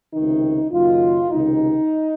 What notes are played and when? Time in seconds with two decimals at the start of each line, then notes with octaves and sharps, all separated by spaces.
0.13 C#2 C3 D#3 D#4
0.72 F#1 F#2 D#3 F4
1.31 C#2 C3 D#3 D#4